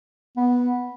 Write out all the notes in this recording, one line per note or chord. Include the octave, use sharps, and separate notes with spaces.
B3